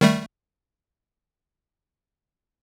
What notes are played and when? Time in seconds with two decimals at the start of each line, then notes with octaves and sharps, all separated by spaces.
0.01 D#3 G3 A3